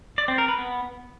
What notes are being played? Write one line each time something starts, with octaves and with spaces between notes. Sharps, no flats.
D5
C4
A#4
B4
B3